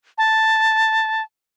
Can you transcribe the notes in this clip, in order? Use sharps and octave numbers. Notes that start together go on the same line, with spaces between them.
A5